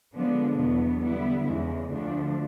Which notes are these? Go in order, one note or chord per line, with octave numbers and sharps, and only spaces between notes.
D3 F3 G#3 B3 D4
E2 B2 F#3 B3
D3 G3 B3 E4
E2 C#3 E3 G#3
D2 D3 F3 A3 D4